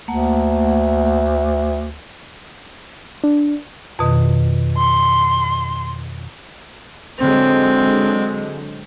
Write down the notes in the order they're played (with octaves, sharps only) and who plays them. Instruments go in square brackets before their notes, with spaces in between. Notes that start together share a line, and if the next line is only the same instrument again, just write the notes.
[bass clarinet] D2 [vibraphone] A3 A#3 F#5
[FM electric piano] D4
[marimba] F2 B2 D#3
[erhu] C6
[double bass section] D3 F#3 G#3 [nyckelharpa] C4